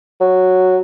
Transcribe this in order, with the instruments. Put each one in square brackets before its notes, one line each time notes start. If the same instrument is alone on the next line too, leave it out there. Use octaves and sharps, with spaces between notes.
[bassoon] F#3